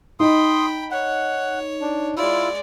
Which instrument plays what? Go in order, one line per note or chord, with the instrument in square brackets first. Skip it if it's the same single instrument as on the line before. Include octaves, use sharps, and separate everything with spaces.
[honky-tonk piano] D#4 [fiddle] G5 B5 [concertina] C6 D#6
[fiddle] C#5 [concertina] F#5
[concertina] D4
[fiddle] G#3 D5 [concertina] E4 F4 E6